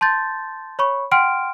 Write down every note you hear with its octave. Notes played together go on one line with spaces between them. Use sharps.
A5 C6 G6 A6
C#5 B5 C#6
F#5 G5 C6 F6 D7